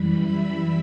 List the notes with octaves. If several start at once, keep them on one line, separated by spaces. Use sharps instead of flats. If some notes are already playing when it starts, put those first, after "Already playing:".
Already playing: F#2 E3 G3 B5
E5